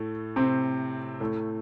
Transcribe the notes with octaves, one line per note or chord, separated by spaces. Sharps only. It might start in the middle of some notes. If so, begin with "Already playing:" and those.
Already playing: A2 A3
C3 C4
A2 A3